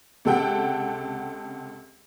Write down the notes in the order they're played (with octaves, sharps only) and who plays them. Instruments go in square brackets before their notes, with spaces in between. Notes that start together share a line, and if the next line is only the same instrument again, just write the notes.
[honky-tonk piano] C#2 C3 A4 F#5 G5